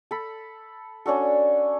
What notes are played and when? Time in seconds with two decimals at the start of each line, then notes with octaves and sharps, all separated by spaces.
0.11 A4 B5
1.06 C#4 D4 F#4 A4